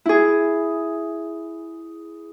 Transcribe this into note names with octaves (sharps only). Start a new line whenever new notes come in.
E4 G#4